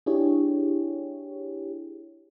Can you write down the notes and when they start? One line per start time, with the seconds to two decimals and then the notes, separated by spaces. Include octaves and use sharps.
0.06 D4 E4 G4 G#4 C#5